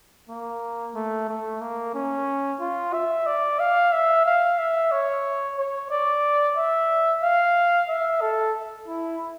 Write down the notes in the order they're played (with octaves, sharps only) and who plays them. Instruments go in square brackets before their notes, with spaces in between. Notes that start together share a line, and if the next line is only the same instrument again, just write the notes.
[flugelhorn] A#3
A3
A3
A#3
C#4
F4
E5
D5
F5
E5
F5
E5
C#5
C#5
D5
E5
F5
E5
A4
E4